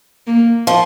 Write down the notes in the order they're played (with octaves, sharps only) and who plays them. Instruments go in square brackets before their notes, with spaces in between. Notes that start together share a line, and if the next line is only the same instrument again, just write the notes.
[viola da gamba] A#3
[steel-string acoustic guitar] F3